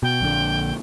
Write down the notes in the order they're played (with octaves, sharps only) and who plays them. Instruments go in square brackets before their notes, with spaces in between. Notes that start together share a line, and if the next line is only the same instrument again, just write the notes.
[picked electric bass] B2 [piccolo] G5
[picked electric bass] A#1 D3